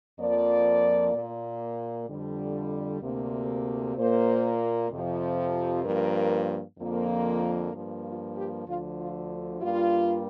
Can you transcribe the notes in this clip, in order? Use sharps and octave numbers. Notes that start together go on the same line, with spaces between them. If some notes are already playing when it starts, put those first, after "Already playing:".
F2 F3 A#3 D5
A#2 A#3
F2 D3 G3
D2 C3 A#3
A#2 A#3 C5
F2 C3 F3
G2 F3 A#3 A#4
F2 D3 F3 A#3
G2 F3 A#3
F4
G4
D2 D3 F3 F4
F4
G2 G3 A#3 F4